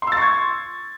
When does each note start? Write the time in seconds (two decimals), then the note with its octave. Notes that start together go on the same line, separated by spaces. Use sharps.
0.02 C6
0.07 E6
0.12 A6
0.17 C#6
0.22 G#6